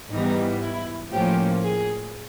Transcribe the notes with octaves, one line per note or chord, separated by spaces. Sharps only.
G#2 E3 G3 B3 D#4
E4
A2 F3 A#3 C#4 G4
G#4